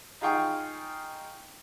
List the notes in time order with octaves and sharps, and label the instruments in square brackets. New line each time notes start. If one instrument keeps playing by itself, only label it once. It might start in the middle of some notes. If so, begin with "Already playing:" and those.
[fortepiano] D#4 F4 G#4 F5 G5 C#6